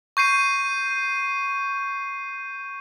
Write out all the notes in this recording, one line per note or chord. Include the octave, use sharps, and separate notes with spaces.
C#6 G6 C7 D#7